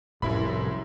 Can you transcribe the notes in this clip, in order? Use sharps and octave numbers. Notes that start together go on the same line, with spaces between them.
F1 C2 F#2 A2 E4 B5